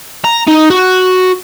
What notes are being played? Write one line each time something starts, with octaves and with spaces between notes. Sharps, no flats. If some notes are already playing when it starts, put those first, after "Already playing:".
A#5
D#4
F#4